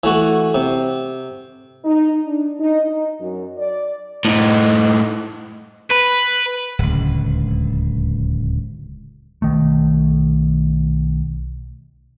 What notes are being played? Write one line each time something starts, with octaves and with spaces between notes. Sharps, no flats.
E3 A3 F#4
C3
D#4
D4
D#4
D#4
F#2
D5
A2 D#4
B4
D1 C#2
B1 D#3 A3